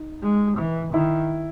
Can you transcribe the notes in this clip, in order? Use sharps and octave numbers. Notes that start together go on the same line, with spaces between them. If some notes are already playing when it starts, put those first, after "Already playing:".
Already playing: D#4
G#3
E3
D#3 E4